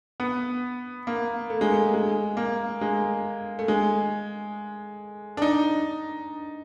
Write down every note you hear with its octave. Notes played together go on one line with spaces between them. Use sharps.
B3
A#3
A3
G#3
A3
G#3
A#3
G#3
A3
G#3
D4
D#4